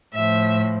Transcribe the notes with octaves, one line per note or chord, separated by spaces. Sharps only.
A2 F3 E5